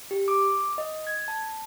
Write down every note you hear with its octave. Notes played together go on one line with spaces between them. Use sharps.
G4
D6
D#5
G#6
A5